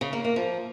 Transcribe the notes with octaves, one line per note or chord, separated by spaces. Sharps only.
C#3
A#3
A#3
F3